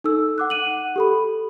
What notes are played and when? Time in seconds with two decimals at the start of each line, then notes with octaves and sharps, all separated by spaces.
0.04 D#4 A4 E6
0.38 F#5 D6 F#6
0.50 F#5 F#6 D#7 F#7
0.96 G4 A4 B5